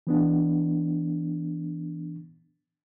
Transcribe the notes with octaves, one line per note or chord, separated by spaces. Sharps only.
E3 B3 D4